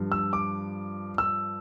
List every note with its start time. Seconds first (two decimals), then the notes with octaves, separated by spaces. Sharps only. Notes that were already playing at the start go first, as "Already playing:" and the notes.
Already playing: G2 F3
0.12 E6
0.33 D6
1.18 E6